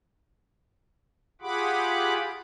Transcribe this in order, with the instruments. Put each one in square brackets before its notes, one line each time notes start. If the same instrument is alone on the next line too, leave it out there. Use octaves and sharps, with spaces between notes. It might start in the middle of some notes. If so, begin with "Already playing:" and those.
[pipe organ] F4 G4 G#4 F#5 B5 D6